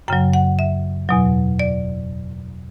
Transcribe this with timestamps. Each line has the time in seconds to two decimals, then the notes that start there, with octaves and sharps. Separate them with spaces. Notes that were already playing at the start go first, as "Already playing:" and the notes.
0.08 F#2 C#3 F#3 G5
0.34 F#5
0.59 E5
1.09 E2 B2 F#3
1.59 D5